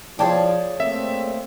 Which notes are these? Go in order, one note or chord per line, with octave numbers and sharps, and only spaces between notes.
F3 G#4 C#5 D5 G5 A5
A3 A#3 C4 E5